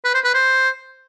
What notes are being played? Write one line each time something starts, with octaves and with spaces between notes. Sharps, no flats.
B4
C5
B4
C5